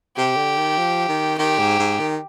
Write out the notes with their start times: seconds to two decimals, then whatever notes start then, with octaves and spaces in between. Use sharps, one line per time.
0.17 C3 G4
0.37 D3
0.57 D#3
0.77 F3
1.08 D#3
1.38 D#3 G4
1.59 G#2
1.79 G#2
1.99 D#3